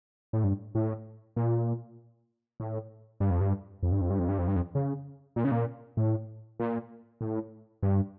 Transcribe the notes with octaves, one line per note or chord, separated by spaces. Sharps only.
A2
G2
A2
A#2
A2
G2
F2
G2
F2
G2
F2
G2
F2
G2
F2
G2
F2
C#3
A#2
C#3
A#2
A2
A#2
A2
G2